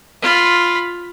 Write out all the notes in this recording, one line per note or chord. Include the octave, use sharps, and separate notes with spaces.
F4 B5